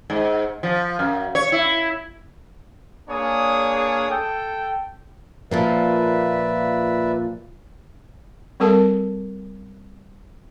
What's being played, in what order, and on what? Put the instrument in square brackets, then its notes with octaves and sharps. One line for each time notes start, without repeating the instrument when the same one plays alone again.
[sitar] G#2
F3
F#2
C#5
E4
[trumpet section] A#3 D4 G#4 C#5 D5 D#6
A4 G5
[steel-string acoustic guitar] A#2 F3 A#3 [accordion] B4 D5 E5
[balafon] G3 C4 A4 A#4 A5